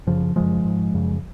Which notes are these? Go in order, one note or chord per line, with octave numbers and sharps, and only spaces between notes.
F#2 C#3 F3
F#2 C#3 F3 G#3
G#2
F#2 C#3